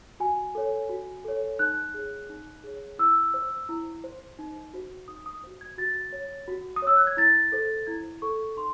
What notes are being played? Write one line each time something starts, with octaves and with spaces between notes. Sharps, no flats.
F#4 G#5
A4 C#5
F#4
A4 C#5
D#4 F#6
G#4 C#5
D#4
G#4 C#5
E4 E6
C5
E4
C5
D#4
F#4 C5
D#4 D#6
D#6
F#4 C5
G#6
F#4 A6
C#5
F#4
D#6
C#5 E6
F#6
G#6
E4 A6
A4 C5
E4 G#6
A4 C5 C#6
D#4 C6